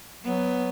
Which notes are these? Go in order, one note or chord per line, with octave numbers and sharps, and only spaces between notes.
F#3 B3